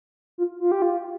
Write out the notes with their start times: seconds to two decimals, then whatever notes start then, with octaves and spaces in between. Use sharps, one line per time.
0.38 F4
0.60 F4
0.71 G4
0.82 F4